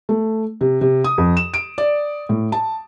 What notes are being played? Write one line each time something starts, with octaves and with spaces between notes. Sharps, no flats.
A3
C3
C3
D#6
F2
E7
D7
D5
A2
A5